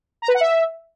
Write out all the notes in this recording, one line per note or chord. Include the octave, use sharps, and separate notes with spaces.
A#5
B4
F#5
E5